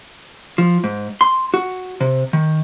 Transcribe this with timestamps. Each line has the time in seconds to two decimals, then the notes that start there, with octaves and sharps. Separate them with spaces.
0.58 F3
0.84 G#2
1.21 C6
1.54 F#4
2.01 C3
2.33 D#3